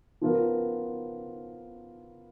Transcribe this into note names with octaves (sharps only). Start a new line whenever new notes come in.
F3 B3 F4 A#4